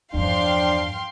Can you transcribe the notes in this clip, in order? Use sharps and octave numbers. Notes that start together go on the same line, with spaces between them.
E2 G2 F3 D4 F5 G5 C6